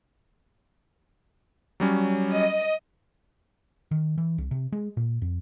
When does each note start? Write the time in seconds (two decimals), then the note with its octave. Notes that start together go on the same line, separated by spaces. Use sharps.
1.80 F#3 G3 C#4
2.32 D#5
3.91 D#3
4.18 E3
4.38 C2
4.51 C3
4.72 G#3
4.97 A#2
5.22 F2